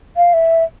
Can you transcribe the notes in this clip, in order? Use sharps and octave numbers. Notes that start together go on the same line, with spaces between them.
F5
E5